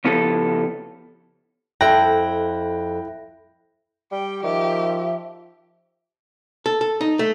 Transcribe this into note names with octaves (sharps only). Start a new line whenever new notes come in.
C#3 F3 B3 E4 G4 A4
F2 E4 A4 G5 F#6 A#6
G3 G5
D#3 F3 G4 E5
A4
A4
D#4
A3